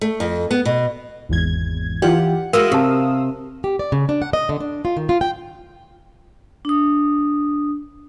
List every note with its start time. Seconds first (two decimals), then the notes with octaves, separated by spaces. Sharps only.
0.01 A3
0.20 F2
0.51 B3
0.65 B2
1.29 G#1 E2 G#6
2.02 E3 F4 G4 D5 F#5
2.53 G#3 E4 F#4 A#4 F5 D#6 E6
2.72 C3 G4 A5
3.64 G4
3.79 D5
3.92 C#3
4.09 D4
4.22 F#5
4.33 D#5
4.49 D3
4.60 D4
4.85 F4
4.97 D#3
5.09 F4
5.21 G5
6.65 D4 D#6